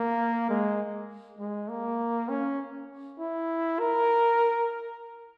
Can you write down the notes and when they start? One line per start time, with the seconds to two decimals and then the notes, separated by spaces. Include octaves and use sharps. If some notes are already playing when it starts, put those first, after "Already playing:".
Already playing: A#3
0.49 G#3
1.39 G#3
1.69 A#3
2.29 C#4
3.19 E4
3.79 A#4